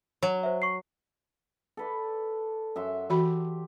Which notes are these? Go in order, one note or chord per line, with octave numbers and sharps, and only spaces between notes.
F#3
C5 E5
C#6 C7
A4 B4 D5
F#2 E5 C6
E3 F#4 G4 B5